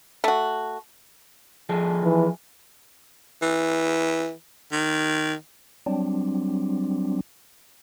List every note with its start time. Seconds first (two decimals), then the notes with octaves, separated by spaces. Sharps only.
0.24 A3 F#4
1.69 F3 G#4 A4
2.03 E3
3.42 E3
4.72 D#3
5.86 F#3 G3 C4 D4